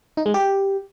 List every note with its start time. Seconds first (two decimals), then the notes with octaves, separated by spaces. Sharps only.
0.17 D#4
0.26 G#3
0.34 G4